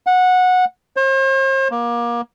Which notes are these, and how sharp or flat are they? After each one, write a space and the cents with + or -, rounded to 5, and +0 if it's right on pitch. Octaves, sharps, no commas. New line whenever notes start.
F#5 -15
C5 +45
A#3 +25